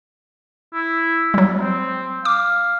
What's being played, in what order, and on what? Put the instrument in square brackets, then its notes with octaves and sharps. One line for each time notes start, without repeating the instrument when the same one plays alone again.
[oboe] E4
[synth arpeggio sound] F#3 G3
[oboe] C4
[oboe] F5 [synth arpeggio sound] D6